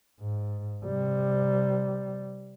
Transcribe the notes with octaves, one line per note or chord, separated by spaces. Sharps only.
G#2
C3 G3